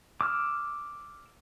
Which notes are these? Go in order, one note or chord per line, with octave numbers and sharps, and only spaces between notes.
D6 E6 F6